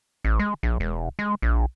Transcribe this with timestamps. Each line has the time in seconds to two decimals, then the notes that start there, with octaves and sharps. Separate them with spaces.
0.25 A1
0.39 G#3
0.63 A#1
0.80 E1
1.19 G#3
1.42 A#1